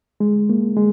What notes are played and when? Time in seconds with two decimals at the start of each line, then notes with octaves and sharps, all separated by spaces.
0.20 G#3
0.50 A#3
0.77 G#3